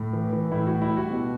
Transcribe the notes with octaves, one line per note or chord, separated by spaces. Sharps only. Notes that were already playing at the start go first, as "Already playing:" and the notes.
Already playing: A2
E3
E3
A2 E4
F#4
G3
E4
G3 F#4
B2